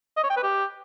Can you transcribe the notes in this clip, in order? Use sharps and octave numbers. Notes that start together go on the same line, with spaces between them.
D#5
C#5
G5
B4
G4